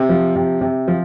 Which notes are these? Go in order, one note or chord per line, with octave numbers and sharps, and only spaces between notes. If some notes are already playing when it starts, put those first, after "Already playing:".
Already playing: C3
F3
C3
C3
F3